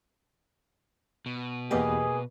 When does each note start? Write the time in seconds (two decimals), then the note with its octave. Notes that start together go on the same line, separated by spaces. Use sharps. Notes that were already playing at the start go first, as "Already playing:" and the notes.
1.26 B2
1.71 E2 A#3 B3 G4 G#4 B4 D#5